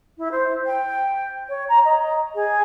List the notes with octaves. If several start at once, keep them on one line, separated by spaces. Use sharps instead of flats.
E4
C5
G5
C#5
A#5
D#5
G#4